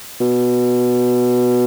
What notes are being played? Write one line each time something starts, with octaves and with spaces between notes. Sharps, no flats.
B2